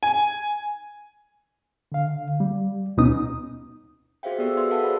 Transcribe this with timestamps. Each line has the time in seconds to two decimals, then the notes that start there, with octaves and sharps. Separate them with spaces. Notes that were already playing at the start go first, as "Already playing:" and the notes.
0.03 G#5
1.92 D3 F5
2.40 G3
2.97 D2 B2 B3 C#4 D#4 D#6
4.23 F#4 G#4 C5 E5 F5 G5
4.39 B3 G4 A4 D5 E6
4.57 F#4 B4 E5 C6 E6
4.70 G#4 A4 D5 F5 F#5 A5
4.82 C5 F#5 B5